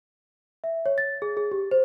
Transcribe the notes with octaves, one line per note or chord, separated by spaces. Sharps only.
E5
C#5
A6
G#4
G#4
G4
C5